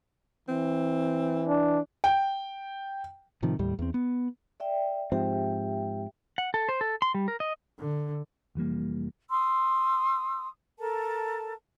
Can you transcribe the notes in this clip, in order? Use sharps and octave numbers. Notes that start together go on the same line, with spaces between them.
E3 C4
D4
G5
A2 C3 D#3 F3
D#2 A2 G3
E2 C4
B3
D5 E5 G5
G#2 F3 C4 G4 E5 G5
F#5
A4
C5
A4
C6
G3
A#4
D#5
D3
F1 E3 G3 A#3
C6 D#6 E6
A4 A#4 A5